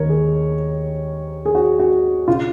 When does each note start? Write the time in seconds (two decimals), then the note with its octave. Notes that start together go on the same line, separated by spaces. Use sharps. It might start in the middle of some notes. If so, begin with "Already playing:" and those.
Already playing: D#2 D#3 A#4 C#5
0.09 G#4
1.45 G#4
1.55 F#4
1.79 F#4
2.27 C#3 F4